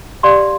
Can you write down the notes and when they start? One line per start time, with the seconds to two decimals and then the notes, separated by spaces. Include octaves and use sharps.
0.23 G4 D5 F5 C6